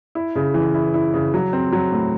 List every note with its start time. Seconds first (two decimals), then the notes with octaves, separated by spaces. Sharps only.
0.15 E4
0.36 C#3
0.54 E3
0.74 E4
0.94 E4
1.14 C#3
1.34 F#3
1.53 C4
1.72 F#3
1.92 A2